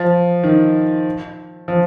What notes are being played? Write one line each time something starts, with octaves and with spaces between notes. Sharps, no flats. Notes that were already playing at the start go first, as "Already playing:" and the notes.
Already playing: F3
D#3
F3